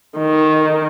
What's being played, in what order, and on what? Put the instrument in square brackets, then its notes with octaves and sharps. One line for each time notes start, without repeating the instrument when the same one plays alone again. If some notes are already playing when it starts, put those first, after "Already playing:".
[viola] D#3